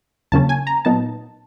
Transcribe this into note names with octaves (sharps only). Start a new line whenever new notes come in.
E2 C#3 F#3 A#3 C#4 A5
G#5
A#5
A#2 F#3 B3 D#4 A5